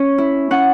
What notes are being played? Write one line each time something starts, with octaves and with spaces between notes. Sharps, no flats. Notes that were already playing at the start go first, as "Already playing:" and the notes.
Already playing: C#4
E4
C#4 F#5